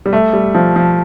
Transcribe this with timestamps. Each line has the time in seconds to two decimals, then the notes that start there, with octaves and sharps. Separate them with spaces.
0.06 G3
0.13 A3
0.33 G3
0.55 F3
0.76 F3